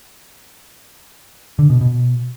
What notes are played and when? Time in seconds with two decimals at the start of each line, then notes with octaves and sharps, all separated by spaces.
1.59 D3
1.70 B2
1.81 B2